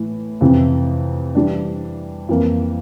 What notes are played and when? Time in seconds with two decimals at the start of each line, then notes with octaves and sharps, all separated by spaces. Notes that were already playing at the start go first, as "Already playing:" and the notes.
Already playing: A2 E3
0.41 F2 C3 E3
1.35 E3 G3 D4
2.29 F2 E3 A#3